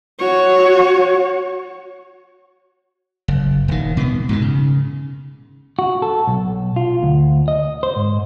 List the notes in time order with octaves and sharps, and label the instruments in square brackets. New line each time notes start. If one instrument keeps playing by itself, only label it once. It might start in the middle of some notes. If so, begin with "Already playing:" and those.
[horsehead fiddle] F#4 C#5
[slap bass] F#1
D#1 D#3
B2 B3
G#2 B2 D#3
C#3
[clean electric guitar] F#4
A4
B1
F4
D2
D#5
C5
G#2